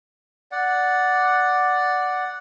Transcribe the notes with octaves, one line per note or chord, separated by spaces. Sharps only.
D5 F#5